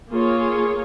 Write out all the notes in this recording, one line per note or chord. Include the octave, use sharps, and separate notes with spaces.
A#3 F4 G#4 C#5